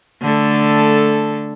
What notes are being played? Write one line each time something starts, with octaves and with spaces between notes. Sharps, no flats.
D3 A3 A4